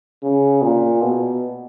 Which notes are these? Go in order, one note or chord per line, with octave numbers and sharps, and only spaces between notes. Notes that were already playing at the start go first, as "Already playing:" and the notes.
C#3
A#2
B2